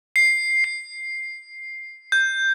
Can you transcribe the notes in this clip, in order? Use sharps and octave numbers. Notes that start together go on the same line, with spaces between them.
C7
C7
G6